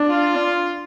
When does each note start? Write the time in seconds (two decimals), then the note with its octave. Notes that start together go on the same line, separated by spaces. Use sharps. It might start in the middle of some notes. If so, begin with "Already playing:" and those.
Already playing: D4
0.09 F4